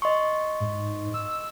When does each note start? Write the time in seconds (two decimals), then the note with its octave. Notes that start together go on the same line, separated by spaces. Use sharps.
0.02 D#5 C6 C#6
0.60 G#2
1.14 E6